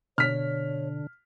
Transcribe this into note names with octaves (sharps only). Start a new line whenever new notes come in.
B2 D3 C#5 F6 B6